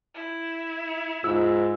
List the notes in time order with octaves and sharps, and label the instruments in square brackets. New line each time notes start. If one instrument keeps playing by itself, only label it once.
[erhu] E4
[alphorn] G#2 [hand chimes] F4 [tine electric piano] E6